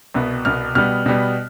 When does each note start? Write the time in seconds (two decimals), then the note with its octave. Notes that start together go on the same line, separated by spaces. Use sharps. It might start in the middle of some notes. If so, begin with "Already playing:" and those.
0.14 C2 B2 B3
0.45 C2 B2 B3 F6
0.75 B2 G3 B3 F6
1.06 B2 G3 B3